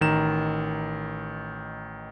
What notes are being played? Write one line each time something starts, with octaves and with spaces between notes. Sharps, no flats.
A1 D#3 A#5 E7